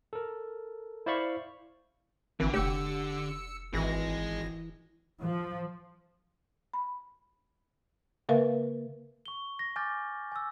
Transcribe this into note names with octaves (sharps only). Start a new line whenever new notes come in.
A4 A#4
E4 C5 D5 F5 B5 C#6
G#1 D3 E3
F1 G4 E6 C#7
G#1 E3 G#4 D#5 A#6
F3
B5
C#3 A#3 A#4 B4 E5 F5
C#6 G7
A#6
G#5 D6 F6 G6 A6 A#6
G#5 E6